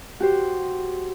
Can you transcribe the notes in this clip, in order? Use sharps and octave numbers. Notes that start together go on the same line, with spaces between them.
F#4 G4 C5